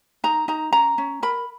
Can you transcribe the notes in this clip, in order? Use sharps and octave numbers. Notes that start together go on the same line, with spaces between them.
D#4 A#5
D#4 A#5
C#4 A#5
C#4
A#4 B5